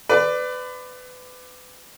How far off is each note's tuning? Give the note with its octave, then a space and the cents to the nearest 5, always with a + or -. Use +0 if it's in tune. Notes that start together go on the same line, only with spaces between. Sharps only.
B4 +30 D5 +10